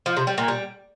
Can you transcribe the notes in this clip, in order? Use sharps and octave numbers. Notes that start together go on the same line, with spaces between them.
F3
C3
G3
A#2
G3